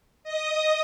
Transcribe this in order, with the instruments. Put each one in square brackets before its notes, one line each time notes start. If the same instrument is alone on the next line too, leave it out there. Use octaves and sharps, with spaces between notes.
[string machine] D#5 D#6